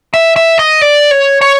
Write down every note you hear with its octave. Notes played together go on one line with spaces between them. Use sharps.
E5
E5
D#5
D5
C#5
C#5